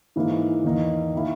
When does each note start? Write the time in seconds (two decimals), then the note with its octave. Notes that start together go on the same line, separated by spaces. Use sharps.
0.16 G#2 E3 A#3 E4
0.64 E2 D#3 A#3 D#4
1.14 D#3 A#3 E4